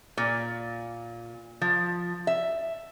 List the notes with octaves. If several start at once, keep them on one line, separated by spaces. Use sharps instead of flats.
A#2
F3
E5